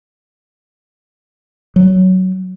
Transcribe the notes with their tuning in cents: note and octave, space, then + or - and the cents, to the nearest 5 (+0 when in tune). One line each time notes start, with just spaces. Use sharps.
F#3 +10